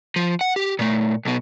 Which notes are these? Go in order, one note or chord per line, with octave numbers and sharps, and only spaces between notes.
F3
F#5
G4
A#2 A3
B1 B2